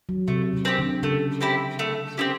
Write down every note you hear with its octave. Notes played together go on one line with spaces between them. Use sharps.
F#3
C3 A3
C3
C4 E4 G4
D3
C#3 A3
C4 E4 G4
A3
C4 E4 G4